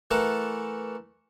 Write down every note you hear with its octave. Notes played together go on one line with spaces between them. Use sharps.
E3 A3 A4 A#4 F#5 A5